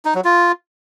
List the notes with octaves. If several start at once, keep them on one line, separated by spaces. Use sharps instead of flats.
D#4
F#3
F4